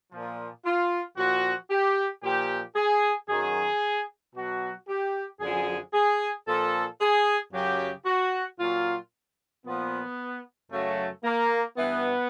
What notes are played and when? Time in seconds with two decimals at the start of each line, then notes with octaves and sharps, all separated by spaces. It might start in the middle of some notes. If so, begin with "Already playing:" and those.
0.10 A#2 F3
0.64 F4
1.16 A#2 F3 F#4
1.70 G4
2.23 A#2 F3 G4
2.76 G#4
3.28 F#2 D#3 F#3 G#4
4.35 B2 F#3 F#4
4.87 G4
5.40 F#2 D3 F3 G#4
5.93 G#4
6.47 A#2 F3 A4
7.00 G#4
7.52 F#2 C#3 F#3 G4
8.06 F#4
8.59 A#2 F#3 F4
9.65 A#2 F3 B3
10.71 F#2 C#3 F#3 A3
11.24 A#3
11.77 G2 E3 B3